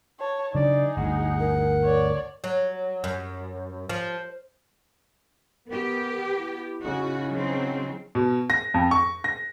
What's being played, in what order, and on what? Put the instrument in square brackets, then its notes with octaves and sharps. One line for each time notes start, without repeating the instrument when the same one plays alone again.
[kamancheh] C#5 A5
[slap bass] C#3 F#3 D4 [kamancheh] D#4 G#4 [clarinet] D5
[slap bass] G1 D2 G2 [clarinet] F#5
[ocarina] A#4
[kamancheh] C#5 D5
[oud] F#3
F#2
F3
[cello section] B3 G4 [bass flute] A#4
[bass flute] E4
[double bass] C#3 D#4 [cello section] F#4
[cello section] F#3 C4
[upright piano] B2
A#6
F2
C#6
A#6